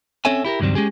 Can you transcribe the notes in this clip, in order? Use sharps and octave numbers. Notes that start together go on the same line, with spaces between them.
C4 C#4 A4 C#5 E5 G#5
E4 G4 A4 A#4
C#2 G2 D#3 F#3 G3 C4
G#3 C#4 G4 G#4